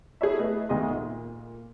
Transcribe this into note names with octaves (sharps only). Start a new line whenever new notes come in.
E4 G#4 A4 C#5 E5
A3 B4 D#5
D2 D#3 G#4 D#5 C6
A#2